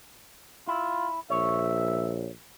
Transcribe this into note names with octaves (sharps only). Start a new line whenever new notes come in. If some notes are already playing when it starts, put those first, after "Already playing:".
E4 F4
A#1 C#5 E5